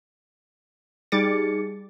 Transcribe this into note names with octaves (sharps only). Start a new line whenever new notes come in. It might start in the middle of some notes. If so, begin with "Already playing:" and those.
G3 D#4 G#4 D6 A6 C#7